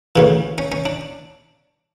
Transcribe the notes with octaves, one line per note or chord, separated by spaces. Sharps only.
D2 C#3 E3
C#4
C#4
D4